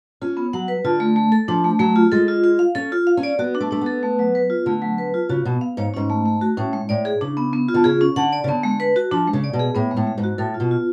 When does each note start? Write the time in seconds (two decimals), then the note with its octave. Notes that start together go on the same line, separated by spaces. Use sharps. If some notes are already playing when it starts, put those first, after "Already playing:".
0.22 C#4 F4
0.37 B3
0.53 F#3 F#5
0.68 B4
0.84 D3 F4
1.00 A3
1.16 A3
1.32 A4
1.48 F3 D4
1.64 A3
1.80 F#3 A3
1.96 F4
2.12 G#3 A4
2.28 F4
2.44 F4
2.59 F5
2.75 C#4 A4
2.92 F4
3.07 F5
3.17 C#4
3.23 D5
3.39 B3 F#4
3.55 D4
3.60 A3
3.71 A3 D4
3.81 B3 A4
4.03 A3
4.19 F#3
4.35 B4
4.50 F4
4.66 D3 A3
4.82 F#3
4.98 B4
5.14 F4
5.29 C#3 F#4
5.45 B2 B3
5.61 F5
5.77 G#2 C#5
5.94 G#2 C#4
6.10 A3
6.26 A3
6.41 F#4
6.57 A2 C#4
6.73 G#3
6.89 A2 D5
7.05 G#4
7.21 C#3 D4
7.37 B3
7.53 B3
7.69 F4
7.74 D3
7.84 C#3 G#4
8.01 C#4
8.16 D3 F#5
8.32 D5
8.44 C#3
8.48 D3 B3
8.63 G#3
8.80 B4
8.96 F#4
9.11 F3 D4
9.27 G#3
9.33 C#3
9.44 D5
9.53 B2
9.59 G#4
9.75 A2 B3
9.91 G#3
9.97 A2
10.07 G#3
10.18 G#2
10.23 F#4
10.38 A2 A4
10.54 F4
10.60 B2
10.71 F4